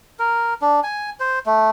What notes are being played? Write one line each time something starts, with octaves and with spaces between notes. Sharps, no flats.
A#4
D4
G#5
C5
A3